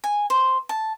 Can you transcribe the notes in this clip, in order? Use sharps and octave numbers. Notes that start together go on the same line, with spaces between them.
G#5
C5
A5